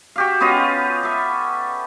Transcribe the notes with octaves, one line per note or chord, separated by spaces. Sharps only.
F#4 G4 F5
B3 C#4 F4 D#5
A4 E5